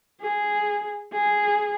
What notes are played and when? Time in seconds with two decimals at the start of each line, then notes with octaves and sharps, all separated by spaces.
0.22 G#4
1.13 G#4